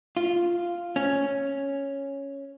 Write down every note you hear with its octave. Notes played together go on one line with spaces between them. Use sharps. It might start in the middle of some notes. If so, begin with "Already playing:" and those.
F4
C#4